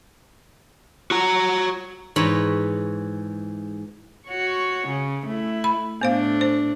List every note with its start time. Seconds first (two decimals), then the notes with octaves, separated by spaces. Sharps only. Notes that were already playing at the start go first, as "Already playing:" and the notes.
1.11 F#4 A#5
2.16 G#2 E3 C#5 D#5 B5
4.28 F#4 C#5
4.87 C#3
5.26 A3 E4
5.64 B5
6.01 A2 A3 B3 D4 C5 F5
6.41 C5